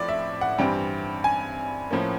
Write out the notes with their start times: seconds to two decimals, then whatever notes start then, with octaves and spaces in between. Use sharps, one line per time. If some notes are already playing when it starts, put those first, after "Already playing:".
Already playing: A2 F3 C4 D5
0.09 E5
0.41 F#5
0.58 G2 E3 G3 C4 G5
1.24 G#5
1.90 A2 F3 A#3 C#4